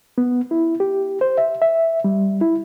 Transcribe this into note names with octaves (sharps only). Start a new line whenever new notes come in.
B3
E4
G4
C5
E5
E5
G3
E4